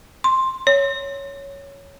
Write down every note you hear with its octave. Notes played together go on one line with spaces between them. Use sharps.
C6
C#5